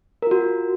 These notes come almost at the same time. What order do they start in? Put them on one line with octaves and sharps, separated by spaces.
A#4 F4 F#4